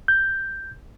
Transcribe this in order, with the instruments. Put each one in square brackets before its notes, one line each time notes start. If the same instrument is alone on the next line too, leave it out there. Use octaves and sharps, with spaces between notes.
[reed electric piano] G6